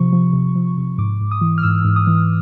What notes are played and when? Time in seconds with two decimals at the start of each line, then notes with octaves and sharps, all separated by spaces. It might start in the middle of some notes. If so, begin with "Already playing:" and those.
Already playing: C3 F3 C#6
0.13 F3
0.33 C3
0.56 F3
0.77 C3
0.98 G#2 D6
1.21 G#2
1.31 D#6
1.41 E3
1.58 F6
1.63 G#2 E6
1.85 G#2
1.96 D#6
2.07 E3